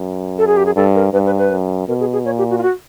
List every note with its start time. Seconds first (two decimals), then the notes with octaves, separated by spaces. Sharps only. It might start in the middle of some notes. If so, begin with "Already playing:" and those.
Already playing: F#2
0.38 A4
0.47 G#4
0.57 G4
0.66 G#4
0.76 G2 A4
0.95 A#4
1.13 G2 B4
1.26 B4
1.38 B4
1.51 F#2
1.88 B2 A#4
2.00 G#4
2.13 G#4
2.25 A#2 C#5
2.38 G4
2.50 F#4
2.58 F4
2.62 F#4